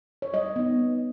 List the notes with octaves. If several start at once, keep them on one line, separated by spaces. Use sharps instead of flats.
C#5
G3 D#5
B3 D#4